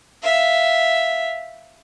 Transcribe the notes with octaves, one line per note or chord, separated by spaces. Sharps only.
E5 F5